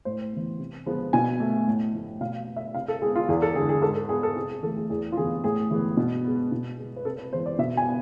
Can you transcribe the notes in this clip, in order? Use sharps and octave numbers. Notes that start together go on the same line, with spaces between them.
A2 C5
E3 B3
C3
F3 G#3 B3
B2 G#5
A3
A2
F3 A3
B2 F5
B3
E5
C3 F5
A4
G#3 B3 G#4
F4
E2 G#4
A4
D3 G#3 G#4
G#4
G#2 A4
A4
G#3 B3 G#4
A4
C3 G#4
G#4
E3 A3 A4
G#4
E2 G#4
F4
C3 E3 B3 G#4
A2 G#4
E3 G#3 B3
B2
G#3 B3
B2
G#3 B3
B4
C3 A4
B4
E3 G#3 B3 C5
D5
B2 E5
G#5
B3